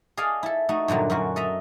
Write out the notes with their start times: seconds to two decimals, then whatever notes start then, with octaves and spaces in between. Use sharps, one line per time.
0.17 G#4 A4 D5 D#5 F5
0.43 E4 A4
0.69 A3 D#4 F#4
0.88 G2 A#2 D3 F#3
1.10 F#2 A#2 D3 F#4
1.36 A4 D#5 E5 A#5